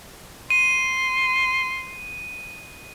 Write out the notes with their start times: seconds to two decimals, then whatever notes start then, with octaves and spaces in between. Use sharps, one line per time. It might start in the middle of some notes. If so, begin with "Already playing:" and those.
0.50 C6 D#7